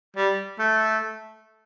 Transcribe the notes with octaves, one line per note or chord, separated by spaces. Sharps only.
G3
A3